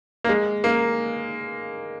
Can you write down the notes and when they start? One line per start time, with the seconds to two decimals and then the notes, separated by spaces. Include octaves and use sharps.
0.24 A#3
0.29 G#3
0.64 A#3